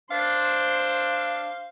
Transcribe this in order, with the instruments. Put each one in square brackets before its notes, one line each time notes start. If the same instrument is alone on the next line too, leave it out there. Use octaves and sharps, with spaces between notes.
[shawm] D4 [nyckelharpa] C5 [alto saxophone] F5